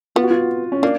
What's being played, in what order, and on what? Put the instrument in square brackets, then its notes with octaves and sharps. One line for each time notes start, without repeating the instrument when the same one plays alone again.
[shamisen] B3 [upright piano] F4
[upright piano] F#4
F4
C#4
[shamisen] A#3 [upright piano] D4